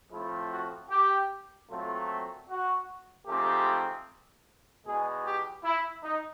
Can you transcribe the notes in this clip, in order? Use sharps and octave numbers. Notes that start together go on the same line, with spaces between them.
A2 F3 A3 C4 E4
F#4
G4
A#2 F#3 A3 C4 F4
F#4
G#2 F3 A3 C4 G4
E2 B2 G#3 G#4
G4
E4
D#4